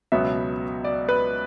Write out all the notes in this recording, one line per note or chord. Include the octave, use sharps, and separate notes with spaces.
C#2 B2 F#3 B3 E5
D5
B4